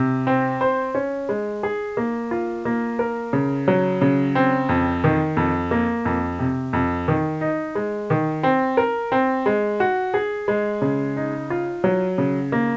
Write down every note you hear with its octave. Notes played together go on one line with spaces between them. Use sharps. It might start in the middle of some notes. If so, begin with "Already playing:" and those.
Already playing: C3
C4
C5
C#4
G#3
G#4
A#3
F4
A#3
A#4
C#3
F#3
C#3
C4
F2
D#3
F2
A#3
F2
C3
F2
D#3
D#4
G#3
D#3
C4
A#4
C4
G#3
F#4
G#4
G#3
C#3
D#4
F4
F#3
C#3
A#3